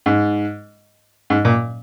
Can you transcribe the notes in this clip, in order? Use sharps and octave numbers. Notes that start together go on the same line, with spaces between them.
G#2
G#2
A#2